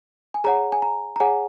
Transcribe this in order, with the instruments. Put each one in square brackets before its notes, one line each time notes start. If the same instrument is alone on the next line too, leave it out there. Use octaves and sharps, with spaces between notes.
[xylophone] G#5
G#4 C#5 F#5 A#5
G#5
A#5
A#5
G#4 C#5 F#5 G#5